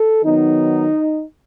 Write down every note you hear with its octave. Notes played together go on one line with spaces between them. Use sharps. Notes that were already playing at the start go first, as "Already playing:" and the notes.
Already playing: A4
D#3 F#3 B3 D#4